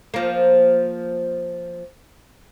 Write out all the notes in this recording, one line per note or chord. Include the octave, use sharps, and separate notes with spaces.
F3 A#3